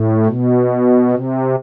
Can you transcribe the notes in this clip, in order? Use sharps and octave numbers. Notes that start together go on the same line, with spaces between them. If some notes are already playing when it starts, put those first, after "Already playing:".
Already playing: A2
B2
C3